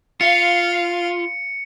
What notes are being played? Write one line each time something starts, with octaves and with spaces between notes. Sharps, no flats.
F4 F5 C#7